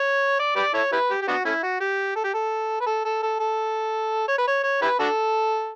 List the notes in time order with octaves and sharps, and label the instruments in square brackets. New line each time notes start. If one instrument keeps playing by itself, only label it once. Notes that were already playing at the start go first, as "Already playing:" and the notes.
Already playing: [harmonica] C#5
D5
G4 B4 D5
E4 A4 C#5
E4 G4 B4
G4
G4
B3 D4 F#4
A3 C#4 E4
F#4
G4
A4
G4
A4
B4
A4
A4
A4
A4
C#5
B4
C#5
C#5
E4 G4 B4
D4 F#4 A4